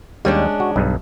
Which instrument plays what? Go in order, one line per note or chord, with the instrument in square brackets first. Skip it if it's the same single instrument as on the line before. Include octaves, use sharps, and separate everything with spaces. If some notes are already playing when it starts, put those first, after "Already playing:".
[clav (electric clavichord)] D#2 G3 [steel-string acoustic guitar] G#3 C#4 D4
[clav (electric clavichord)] F#4
B1 G2